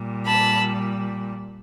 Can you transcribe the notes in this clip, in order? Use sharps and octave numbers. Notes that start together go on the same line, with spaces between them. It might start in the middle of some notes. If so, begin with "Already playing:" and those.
Already playing: A#2 G3
A5 B5